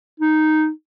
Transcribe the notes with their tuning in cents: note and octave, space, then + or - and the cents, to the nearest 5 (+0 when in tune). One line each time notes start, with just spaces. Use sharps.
D#4 -5